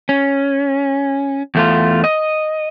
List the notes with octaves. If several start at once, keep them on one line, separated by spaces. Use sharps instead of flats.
C#4
E2 A3 F4
D#5